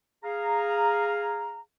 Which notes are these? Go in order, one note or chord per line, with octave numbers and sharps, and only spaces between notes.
G#4 F5 A#5